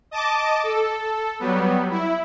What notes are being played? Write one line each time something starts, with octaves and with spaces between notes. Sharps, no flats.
D#5 A5 D6
A4
F#3 G3 B3
E4